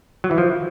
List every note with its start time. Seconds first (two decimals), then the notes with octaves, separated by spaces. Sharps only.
0.24 F#3
0.31 E3
0.38 F3